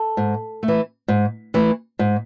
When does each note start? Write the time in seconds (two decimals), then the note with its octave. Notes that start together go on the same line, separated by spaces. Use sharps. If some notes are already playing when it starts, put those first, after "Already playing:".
Already playing: A4
0.17 G#2
0.63 A3
0.68 E3
1.08 G#2
1.54 E3 A3
1.99 G#2